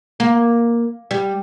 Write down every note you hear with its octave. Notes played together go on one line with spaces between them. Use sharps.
A#3
G3